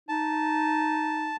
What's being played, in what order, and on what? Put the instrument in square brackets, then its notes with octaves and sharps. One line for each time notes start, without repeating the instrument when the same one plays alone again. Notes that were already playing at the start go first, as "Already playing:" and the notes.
[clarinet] D#4 [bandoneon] A5